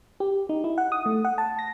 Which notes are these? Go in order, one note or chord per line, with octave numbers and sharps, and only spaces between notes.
G4
D#4
E4
F#5
D#6
A3
F#5
A5
A#6